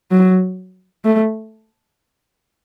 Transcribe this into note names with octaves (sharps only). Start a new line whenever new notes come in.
F#3
A3